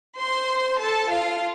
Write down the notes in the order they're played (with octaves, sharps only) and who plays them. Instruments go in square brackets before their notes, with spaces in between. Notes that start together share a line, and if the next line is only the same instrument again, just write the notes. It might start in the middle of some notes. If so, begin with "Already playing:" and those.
[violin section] C5 C6
A4 A5
F4 F5